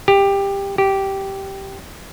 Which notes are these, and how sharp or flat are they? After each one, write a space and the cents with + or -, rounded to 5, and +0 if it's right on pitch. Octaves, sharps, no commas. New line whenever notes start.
G4 +15
G4 -10